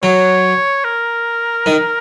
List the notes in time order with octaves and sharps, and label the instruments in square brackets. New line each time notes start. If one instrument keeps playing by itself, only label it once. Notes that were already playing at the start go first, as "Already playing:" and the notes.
[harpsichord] F#3 [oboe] C#5
[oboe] A#4
[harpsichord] D#3